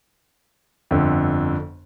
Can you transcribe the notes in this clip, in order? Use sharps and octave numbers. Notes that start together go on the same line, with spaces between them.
G1 F2 D3